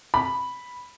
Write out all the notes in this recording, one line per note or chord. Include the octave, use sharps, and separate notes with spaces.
B5